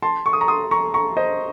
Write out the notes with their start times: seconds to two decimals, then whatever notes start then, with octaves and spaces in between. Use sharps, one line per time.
0.02 A5 C6
0.26 C#6
0.33 D#6
0.41 A#5 C#6
0.48 C6 D#6
0.71 A#5 C#6
0.94 A#5 C#6
1.17 C5 D#5